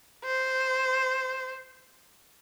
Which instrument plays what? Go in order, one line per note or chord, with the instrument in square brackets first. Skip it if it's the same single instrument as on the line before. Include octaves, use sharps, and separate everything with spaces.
[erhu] C5